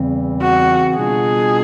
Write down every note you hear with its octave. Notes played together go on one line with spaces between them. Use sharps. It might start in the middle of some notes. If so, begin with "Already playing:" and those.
Already playing: E2 C#3 E3 G3 C4
F#4
B2 G3 B3 D4 F4 G#4